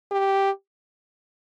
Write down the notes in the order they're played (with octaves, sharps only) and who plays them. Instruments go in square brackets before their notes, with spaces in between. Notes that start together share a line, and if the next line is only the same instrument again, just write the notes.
[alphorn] G4